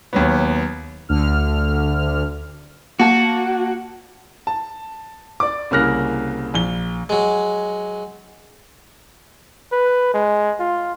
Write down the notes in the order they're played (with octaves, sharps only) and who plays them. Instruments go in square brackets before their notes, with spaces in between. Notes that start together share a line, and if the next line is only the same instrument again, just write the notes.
[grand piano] D#2 F#3 B3
[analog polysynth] D2 D3 F6
[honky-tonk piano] A#3 A5 [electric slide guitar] F#4
[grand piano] A5
D5 D6
C2 C#3 A#3 F6 F#6 A#6
A#1 G7
[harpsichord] F#3 G#3
[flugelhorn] B4
G#3
F4